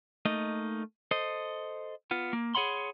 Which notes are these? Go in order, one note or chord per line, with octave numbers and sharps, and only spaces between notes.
A3 A#3 D#4 D#5
A4 C5 D#5
B3 F4
A#3
G#4 C#5 F#5 B5 C6